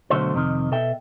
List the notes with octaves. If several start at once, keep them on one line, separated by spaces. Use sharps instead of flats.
B1 F#2 D3 A3 F#4 C5
F2 C3 D#3
B2 A4 E5 G5